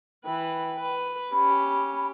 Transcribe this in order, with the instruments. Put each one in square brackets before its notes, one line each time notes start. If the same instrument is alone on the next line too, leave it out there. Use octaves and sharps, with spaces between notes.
[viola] E3 B4 [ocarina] G5
[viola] B4
[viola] C#4 G4 [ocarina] B5